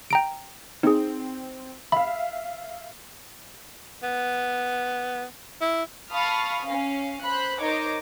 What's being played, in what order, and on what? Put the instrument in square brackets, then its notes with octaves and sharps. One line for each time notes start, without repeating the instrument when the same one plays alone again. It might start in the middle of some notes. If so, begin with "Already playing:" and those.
[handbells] G5 A#5 D7
[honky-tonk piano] C4 [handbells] D#4 G#4
[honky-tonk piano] E5 F5 [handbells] B5
[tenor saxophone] B3
E4
[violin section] F5 A5 B5 C#6 D#6 F6
C#4 F5
C5 B5 F#6
D#4 A#4 C5 C#5 D#5 D6